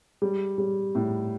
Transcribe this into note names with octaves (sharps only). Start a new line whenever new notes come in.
G3
G3
A2